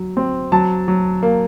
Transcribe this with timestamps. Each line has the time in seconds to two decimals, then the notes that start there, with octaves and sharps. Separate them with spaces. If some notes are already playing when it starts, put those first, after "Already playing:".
Already playing: F#3
0.17 C4
0.52 F#3 A5
0.88 F#3
1.23 A#3